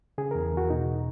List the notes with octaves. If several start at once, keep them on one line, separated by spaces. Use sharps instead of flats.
C#3 G#4
E2 A#4
E2 F#4
B2 D#4